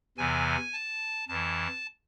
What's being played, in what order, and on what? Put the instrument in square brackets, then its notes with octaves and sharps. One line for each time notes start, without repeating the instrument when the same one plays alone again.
[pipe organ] E2 C3 E3 G#5
A5
F2 E3 A5